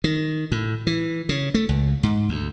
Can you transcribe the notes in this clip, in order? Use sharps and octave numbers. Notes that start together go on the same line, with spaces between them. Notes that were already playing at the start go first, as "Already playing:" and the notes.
D#3
A2
E3
C#3
A3
C#2
G#2
D2